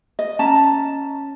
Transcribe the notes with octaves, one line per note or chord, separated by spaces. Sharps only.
D#5
C#4 A5 A#5